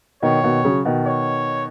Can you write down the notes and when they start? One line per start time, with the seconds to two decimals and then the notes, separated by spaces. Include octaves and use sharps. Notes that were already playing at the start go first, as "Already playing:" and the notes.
0.22 B2 D#3 C#5
0.44 B2 D#3
0.65 C#3 F#3
0.85 B2 D#3
1.06 C#5